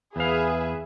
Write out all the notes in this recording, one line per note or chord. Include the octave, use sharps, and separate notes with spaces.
E2 G#4 B4 E5 F5